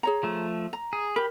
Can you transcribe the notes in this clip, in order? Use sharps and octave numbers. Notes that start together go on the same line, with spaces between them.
G#4 C#5 A#5
F3 A3
A#5
G#4
G4 A#4 B5